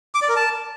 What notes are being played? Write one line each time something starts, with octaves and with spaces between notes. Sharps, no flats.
D6
D5
A#4
A5